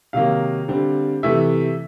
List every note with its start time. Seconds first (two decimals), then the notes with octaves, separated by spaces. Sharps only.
0.13 C3 D#3 F#3 A#3 F5
0.68 D3 G3 C4
1.23 C3 E3 A3 E5